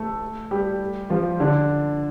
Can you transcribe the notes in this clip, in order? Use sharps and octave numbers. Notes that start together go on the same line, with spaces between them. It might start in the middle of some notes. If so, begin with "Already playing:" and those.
Already playing: A3 A4
G3 G4
F3 F4
D3 D4